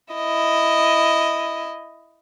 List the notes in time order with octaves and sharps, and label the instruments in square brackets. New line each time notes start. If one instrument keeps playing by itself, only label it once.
[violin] E4 D#5